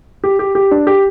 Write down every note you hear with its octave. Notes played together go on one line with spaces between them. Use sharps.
G4
G4
G4
D4
G4